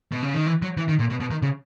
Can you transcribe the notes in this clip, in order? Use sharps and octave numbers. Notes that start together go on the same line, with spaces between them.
B2
C#3
D#3
E3
F#3
E3
D#3
A#2
B2
B2
D#3
C#3